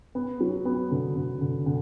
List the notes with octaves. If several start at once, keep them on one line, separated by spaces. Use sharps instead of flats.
B3
F#3
B3
D3
D3
D3
D3